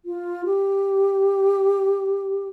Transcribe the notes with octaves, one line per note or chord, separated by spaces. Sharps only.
F4
G4